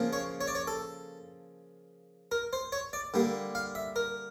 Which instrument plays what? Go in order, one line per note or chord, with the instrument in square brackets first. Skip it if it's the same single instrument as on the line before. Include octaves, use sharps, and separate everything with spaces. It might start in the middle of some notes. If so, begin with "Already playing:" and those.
Already playing: [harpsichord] C#3 F3 A#3
C#5
C#5
D5
C#5
A4
A#4
C5
C#5
D5
D3 G3 A#3
F5
E5
A#4